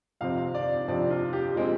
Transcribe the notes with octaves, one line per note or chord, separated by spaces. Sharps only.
F2 C3 F3 C4 F5
F5
D5
F2 C3 F3 C4 D5
F4
G4
A#2 G#3 C4